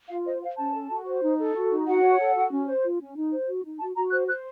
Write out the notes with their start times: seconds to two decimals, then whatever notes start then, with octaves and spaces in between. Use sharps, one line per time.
0.09 F4 F5
0.25 C5 D#5
0.42 C5 F5
0.57 C#4 A5
0.73 A4
0.90 F#4
1.06 C5
1.22 D#4
1.39 A4
1.55 F#4
1.70 D#4
1.86 F#4 F#5
2.02 C#5
2.18 A4
2.35 F#4
2.51 C#4
2.67 C5
2.83 F4
2.99 C#4
3.15 D#4
3.31 C5
3.47 F#4
3.63 D#4
3.79 F#4 A5
3.96 F#4 A#5
4.11 C5 F#6
4.27 C5 F#6